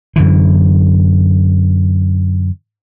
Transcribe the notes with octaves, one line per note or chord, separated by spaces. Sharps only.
F#2 D3 E3